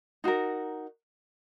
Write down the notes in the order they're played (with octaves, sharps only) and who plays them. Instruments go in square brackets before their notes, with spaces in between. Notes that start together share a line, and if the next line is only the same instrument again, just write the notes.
[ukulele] D#4 F#4 A#4